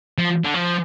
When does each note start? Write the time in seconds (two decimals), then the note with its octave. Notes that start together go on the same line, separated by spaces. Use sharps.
0.18 F3
0.44 D3
0.54 F3